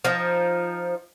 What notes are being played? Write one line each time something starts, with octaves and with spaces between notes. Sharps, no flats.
F3 D#4